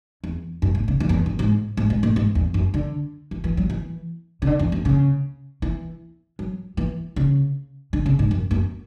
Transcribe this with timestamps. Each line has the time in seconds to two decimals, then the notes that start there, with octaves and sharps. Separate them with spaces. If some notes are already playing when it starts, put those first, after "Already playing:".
0.24 E2
0.62 F#2
0.75 A2
0.88 C#3
1.00 E2
1.09 F#2
1.13 E2
1.26 F#2
1.39 G#2
1.77 G#2
1.90 G#2
2.03 A2
2.16 G#2
2.35 E2
2.54 F#2
2.74 D3
3.31 E3
3.44 E3
3.57 F#3
3.70 E3
4.42 C#3
4.47 D3
4.59 E2
4.72 F#2
4.85 C#3
5.62 E3
6.39 F#3
6.77 E3
7.16 C#3
7.93 D3
8.06 C#3
8.19 G#2
8.31 F#2
8.51 F#2